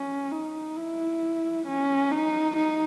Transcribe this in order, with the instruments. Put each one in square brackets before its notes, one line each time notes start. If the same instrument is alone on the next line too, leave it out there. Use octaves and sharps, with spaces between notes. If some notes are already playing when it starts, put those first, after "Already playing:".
Already playing: [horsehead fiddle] C#4
D#4
E4
C#4
D#4
D#4